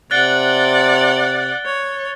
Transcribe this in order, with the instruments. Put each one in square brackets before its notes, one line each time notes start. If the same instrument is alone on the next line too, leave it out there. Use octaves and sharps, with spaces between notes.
[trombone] C3 [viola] D5 F#5 [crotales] F#6 A6 G7
[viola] C#5